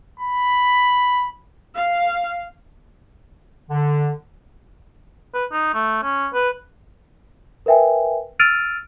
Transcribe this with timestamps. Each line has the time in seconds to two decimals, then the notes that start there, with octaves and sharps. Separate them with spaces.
0.20 B5
1.75 F5
3.70 D3
5.34 B4
5.52 D#4
5.74 A3
6.03 C#4
6.34 B4
7.66 A#4 B4 E5 G5 G#5
8.39 E6 F6 A6 D7 D#7 F7